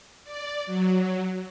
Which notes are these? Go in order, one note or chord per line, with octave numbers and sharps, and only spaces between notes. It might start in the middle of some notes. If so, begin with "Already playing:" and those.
D5
F#3